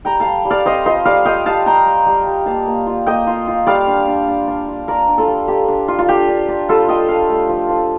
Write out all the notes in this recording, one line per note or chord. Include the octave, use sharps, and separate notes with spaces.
G3 G5 A#5
F5 A5
G3
G3
D5 F5
C4 C5 D#5
F4 C5 D#5
G3 D5 F5
F4 D#5 G5
G3 F5 A5
G3 G5 A#5
G3
G3
G3
A#3 F5 A5
A#3
F4
A#3 D#5 G5
F4
F4
G3 D5 F5
D4
D4
D4
D4
F4
F4 A#4 D5
D4
F4 A4
G3
F4 G4
D4
F4
F4
D4 G4
D4
D4
G3 F4 A4
F4 D#5 G5
D4 F5 A5
A3
F3
F3